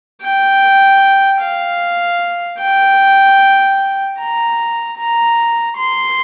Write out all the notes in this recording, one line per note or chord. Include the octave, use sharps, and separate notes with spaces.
G5
F5
G5
A#5
A#5
C6